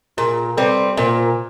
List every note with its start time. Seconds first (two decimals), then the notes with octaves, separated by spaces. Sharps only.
0.17 A#2 G#4 A#4
0.57 G3 C4 A4 B4
0.97 A#2 A#4 C5